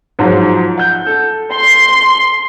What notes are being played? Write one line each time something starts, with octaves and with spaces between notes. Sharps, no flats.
G#2 F3 F#3
F#5 G6
A4
C6